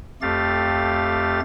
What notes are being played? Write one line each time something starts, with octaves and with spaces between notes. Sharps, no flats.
F2 A3 G4 F5 A6